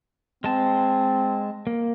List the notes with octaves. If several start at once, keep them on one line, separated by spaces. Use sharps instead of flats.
G#3 C4 A5
A#3